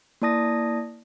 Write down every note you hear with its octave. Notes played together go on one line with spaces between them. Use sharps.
A#3 E4 D5 A5 D#6 A#6